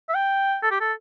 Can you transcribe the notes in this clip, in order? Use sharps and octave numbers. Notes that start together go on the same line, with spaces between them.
E5
G5
A4
G4
A4